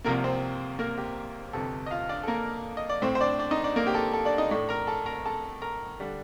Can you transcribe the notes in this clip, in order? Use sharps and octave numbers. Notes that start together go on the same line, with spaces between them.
C2 C3 F3 A#3 A#4
C4 C5
A#3 A#4
G4
G1 F2 C3 A4
D#5
F4 F5
D4 D5
A4
A#3 A#4
D#5
D5
A2 A3 C4 C5
C5
D4 D5
D4 D5
D#4 D#5
D4 D5
A#3 A#4
G4
A4
A4
D4 D5
D#4 D#5
A2 A3 D4
A#4 A#5
A4 A5
A#4 A#5
A4 A5
A#4 A#5
D3 G3 D4